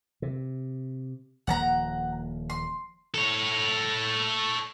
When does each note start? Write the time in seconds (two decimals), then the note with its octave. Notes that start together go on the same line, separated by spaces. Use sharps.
0.22 C3
1.47 D#1 F3 A#3 F#5 A5 A#5
2.50 C6
3.14 A4 C#5